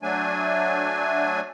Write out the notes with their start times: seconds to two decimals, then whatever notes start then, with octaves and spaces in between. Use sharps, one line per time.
0.03 F#3 A3 D4 G#5